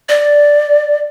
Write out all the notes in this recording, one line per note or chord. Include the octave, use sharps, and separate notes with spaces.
D5